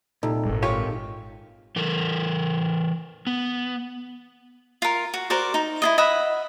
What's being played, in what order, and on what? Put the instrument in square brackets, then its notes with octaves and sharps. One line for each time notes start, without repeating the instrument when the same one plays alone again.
[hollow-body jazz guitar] C2 [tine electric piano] A#2 D#4 A4
[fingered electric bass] G#1 G#2
[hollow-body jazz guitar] F4 G4 G#5 [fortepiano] C#5
[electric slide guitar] E3 A4 A#4
B3
[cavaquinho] F4 A#4
F#4
F#4 A#4 C5 D5
D#4
E4 F4 D#5
D#5 E5 F#5 B5